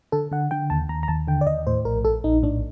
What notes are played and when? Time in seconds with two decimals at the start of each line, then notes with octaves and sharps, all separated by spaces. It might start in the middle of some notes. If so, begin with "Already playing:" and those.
0.12 D3 A4
0.31 D3 F#5
0.51 D3 G5
0.70 D#2 A5
0.89 D#2 A#5
1.03 A#5
1.08 D#2 A5
1.28 D3 G5
1.41 D5
1.47 D#2 D#5
1.67 A2 C5
1.85 A#1 A#4
2.05 A#1 A4
2.24 A#1 D#4
2.43 A2 D4